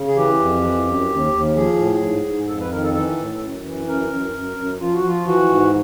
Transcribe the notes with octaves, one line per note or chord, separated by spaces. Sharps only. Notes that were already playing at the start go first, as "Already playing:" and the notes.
Already playing: C#3
G#4
E3 G4
F2
E3
F#2
D#2
D#2
F3 G#4
A2
G#2
G#2
F2 A4
B4
D#3 A#4
A4
E3 A4
A2
F#2
E3
F#2 A#4
F#2
F#2
F#2
F3 F4
F#4
F3 F4
E3 F#4
G#2